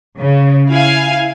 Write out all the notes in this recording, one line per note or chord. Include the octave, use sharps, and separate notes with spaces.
C#3
E4 F5 G#5